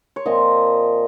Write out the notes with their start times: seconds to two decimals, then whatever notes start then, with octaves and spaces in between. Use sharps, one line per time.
0.16 C#5
0.26 A#2 F3 C4 D#5